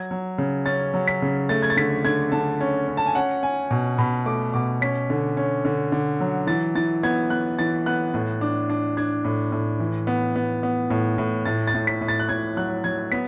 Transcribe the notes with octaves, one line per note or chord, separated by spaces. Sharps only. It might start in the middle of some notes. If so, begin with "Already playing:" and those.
Already playing: F#3 G#6
F#3
C#3
C#4 A6
F#3
B6
C#3
A3 A6
G#6
A6
D3 B6
D3 G#6
D3 A5
C#4
C#4
A5
G#5
C#4 F#5
C#4 G#5
B2
B2 B5
A3 D6
B2 D6
C#4 B6
D3
C#4
D3
D3
F#3
E3 A6
E3 A6
B3 G#6
B3 F#6
E3 A6
B3 F#6
A2
D4
D4
D4 G#6
A2
A2
E3
B3
B3
B3
A2
A2
A2 A6
A6
A2
B6
A2
A6
F#6
A2 G#6
F#3 F#6
F#3 G#6
B3 B6